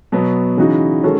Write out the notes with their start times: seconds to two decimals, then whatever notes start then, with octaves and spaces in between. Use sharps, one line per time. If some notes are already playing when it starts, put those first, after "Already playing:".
0.12 B2 F#3 B3
0.57 C#3 E3 B3 D#4 F#4
1.03 D#3 G#3 C#4 F#4 A4